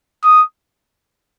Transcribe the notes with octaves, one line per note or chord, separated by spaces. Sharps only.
D#6